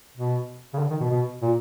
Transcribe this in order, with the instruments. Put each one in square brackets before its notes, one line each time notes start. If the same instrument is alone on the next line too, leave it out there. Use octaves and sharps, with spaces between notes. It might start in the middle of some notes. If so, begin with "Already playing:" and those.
[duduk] B2
C#3
D3
D#3
B2
B2
A#2